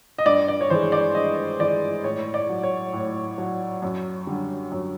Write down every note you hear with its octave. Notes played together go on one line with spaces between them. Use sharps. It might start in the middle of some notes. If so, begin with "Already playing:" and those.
D#5
G2 D5
D5
C#5
E3 G#3 C5
D5
G2 D#5
E3 G#3 D5
A2 C#5
D5
F#3
C#5
A2
F#3
F#2
D3 G3
F#2